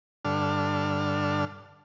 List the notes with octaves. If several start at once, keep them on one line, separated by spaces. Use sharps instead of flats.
G2 D3 D4 A4 F6